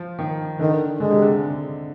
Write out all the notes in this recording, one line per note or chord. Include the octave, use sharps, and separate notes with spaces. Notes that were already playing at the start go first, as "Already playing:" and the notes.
Already playing: F3
D#3
D3 D#3
D3 G#3
C3
D3